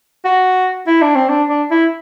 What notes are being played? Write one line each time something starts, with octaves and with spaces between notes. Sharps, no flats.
F#4
E4
D4
C4
D4
D4
E4